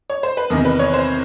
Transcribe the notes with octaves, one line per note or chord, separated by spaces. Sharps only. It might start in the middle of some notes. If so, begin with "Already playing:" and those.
C#5
C5
B4
E2 C3 D#3 A#4
B4
C#5
C5